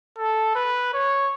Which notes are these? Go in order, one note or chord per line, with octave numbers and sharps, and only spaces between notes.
A4
B4
C#5